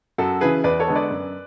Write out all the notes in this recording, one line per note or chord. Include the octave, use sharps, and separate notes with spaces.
F#2 F#4 A4
C#3 E3 G#4 B4
E2 B4 D5
A4 C#5
D3 G#3 B3
B4 D5
F#2